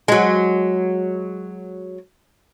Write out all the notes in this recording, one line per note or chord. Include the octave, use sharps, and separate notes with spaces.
F#3 G#3